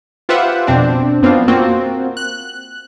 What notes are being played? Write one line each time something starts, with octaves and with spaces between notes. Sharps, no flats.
F4 G4 B4 C5 E5 F#5
F2 B2 C4 D4
F#2 B3 C4 D4 F4
A#3 C4 F4 F#4
F#6